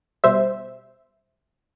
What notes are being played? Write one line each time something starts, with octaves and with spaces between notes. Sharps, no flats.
B2 G3 C5 E5